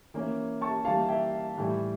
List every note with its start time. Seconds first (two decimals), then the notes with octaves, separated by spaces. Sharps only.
0.14 E3 A#3 C#4
0.61 A5 C#6
0.85 E3 G3 A#3 F5 A5
1.09 E5 G5
1.58 A2 E3 G3